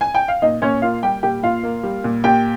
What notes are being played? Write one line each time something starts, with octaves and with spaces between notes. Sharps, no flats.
G#5
G5
F5
A#2 D#4 D#5
A#2 C#4 C#5
A#3 F4 F5
G3 G4 G5
A#2 G4 G5
A#2 F4 F5
A#3
G3
A#2
A#2 G4 G5